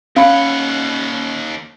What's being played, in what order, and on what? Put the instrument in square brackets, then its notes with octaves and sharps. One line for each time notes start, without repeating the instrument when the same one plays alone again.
[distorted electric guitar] D#2 F#5 [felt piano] C#4 B5 [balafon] F5